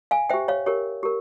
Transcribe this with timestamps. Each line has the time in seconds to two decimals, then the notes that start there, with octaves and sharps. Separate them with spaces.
0.11 F5 G#5
0.29 G4 C5 E5 G5
0.48 C#5 F5
0.66 G4 A#4 C#5
1.03 G4 A#4